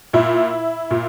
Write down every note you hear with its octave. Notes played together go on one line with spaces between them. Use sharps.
A#2 E4
A#2